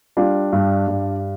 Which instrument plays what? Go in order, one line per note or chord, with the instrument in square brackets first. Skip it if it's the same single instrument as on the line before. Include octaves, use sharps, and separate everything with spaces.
[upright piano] G3 D4 F4
G2
G2